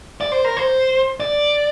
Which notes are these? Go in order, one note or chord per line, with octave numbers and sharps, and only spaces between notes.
D5
C5
A#4
C5
D5